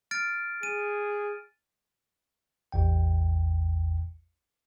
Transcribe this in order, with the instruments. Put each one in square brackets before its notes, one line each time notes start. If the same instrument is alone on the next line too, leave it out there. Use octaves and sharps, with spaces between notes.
[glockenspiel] F6 A6 D7
[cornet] G#4 [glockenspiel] D#7
[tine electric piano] A1 E2 G5